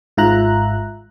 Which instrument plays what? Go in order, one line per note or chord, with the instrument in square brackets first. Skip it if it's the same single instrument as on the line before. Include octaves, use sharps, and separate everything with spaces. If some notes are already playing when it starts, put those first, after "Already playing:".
[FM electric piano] G#1 G#2 F4 E5 A#5 F#6